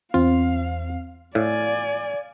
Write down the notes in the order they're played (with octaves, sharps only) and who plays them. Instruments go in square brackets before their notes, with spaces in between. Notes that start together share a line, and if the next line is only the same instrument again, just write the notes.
[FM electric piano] E2 C4 [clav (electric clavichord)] F4 [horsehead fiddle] F5
[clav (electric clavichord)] A2 [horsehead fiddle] D5 G#5 [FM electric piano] F5